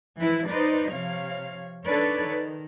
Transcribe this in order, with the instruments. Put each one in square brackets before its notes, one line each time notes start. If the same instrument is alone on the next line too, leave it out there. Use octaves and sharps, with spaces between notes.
[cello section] E3 F3 E4 B4
D#4 B4 C5 D5
C3 F3 C#5 F5
D4 D#4 A4 B4 C#5 D5
D#3